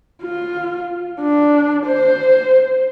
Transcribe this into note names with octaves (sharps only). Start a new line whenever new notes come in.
F4
D4
C5